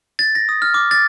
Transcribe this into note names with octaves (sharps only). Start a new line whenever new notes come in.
A6
A#6
D#6
F6
D6
A6